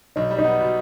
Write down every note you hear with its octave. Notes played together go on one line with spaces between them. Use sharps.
B1 D#4
G3
D#4
B3
B2